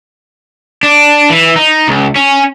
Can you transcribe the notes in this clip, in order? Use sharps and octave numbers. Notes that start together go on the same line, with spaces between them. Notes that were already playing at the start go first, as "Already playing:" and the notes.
D4
E3
D#4
C#2
C#4